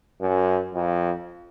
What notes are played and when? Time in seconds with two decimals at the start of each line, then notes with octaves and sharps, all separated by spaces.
0.21 F#2
0.75 F2